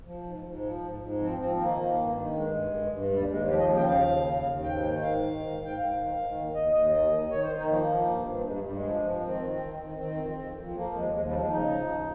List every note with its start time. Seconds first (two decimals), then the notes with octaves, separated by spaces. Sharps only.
0.05 F3
0.23 G#2
0.43 G#2
0.61 F3
0.82 G#2
1.00 G#2
1.19 F3 C4
1.38 F3 C4
1.57 D#3 A#3
1.77 D#3
1.96 G2
2.15 D#3
2.33 G2 G#3
2.53 G2
2.73 G2
2.91 G2
3.11 D#2 G3
3.29 D#2 G#3
3.48 F3 G4
3.58 D#5
3.68 C#3
3.76 G5
3.86 D#2 F5
4.05 C#3
4.25 D#2
4.45 D#2
4.63 G#2 G5
4.82 D#3
5.01 G#2 F5
5.21 D#3
5.39 G#2
5.58 G#2
5.65 G5
5.77 G#2 F5
5.97 D#3
6.16 D#3
6.35 D#2
6.55 D#2 D#5
6.73 D#2 D#5
6.92 D#3 D#5
7.11 D#3
7.30 D#3 C#5
7.43 C5
7.49 D#3
7.56 D#4
7.69 F3 A#3
7.87 F3
8.07 G2
8.26 G2
8.45 G2 G#3
8.64 G2 G3
8.73 G#3
8.83 F3
9.02 F3
9.21 D#3 C4
9.41 D#3
9.60 D#3
9.79 D#3
9.98 D#3 C4
10.17 F2
10.36 F2
10.54 F2
10.74 F3 A#3
10.93 D#2 G#3
11.12 D#2 G#3
11.26 G3
11.31 F3
11.38 G#3
11.50 C#3 D#4
11.70 F3
11.88 D#2